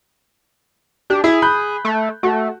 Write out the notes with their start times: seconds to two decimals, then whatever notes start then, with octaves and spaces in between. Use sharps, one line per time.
1.10 D4 G4
1.24 E4 G#4
1.42 B5 F#6 G6
1.85 A3
2.23 A3 F#4